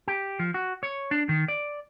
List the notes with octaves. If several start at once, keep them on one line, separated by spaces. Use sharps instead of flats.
G4
F3
F#4
C#5
D4
D#3
D5